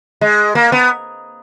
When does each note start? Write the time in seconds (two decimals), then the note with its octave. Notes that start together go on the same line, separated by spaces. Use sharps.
0.21 G#3
0.55 A#3
0.72 B3